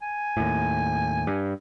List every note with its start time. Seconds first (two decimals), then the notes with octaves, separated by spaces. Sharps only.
0.02 G#5
0.37 D#2 A2
1.27 G2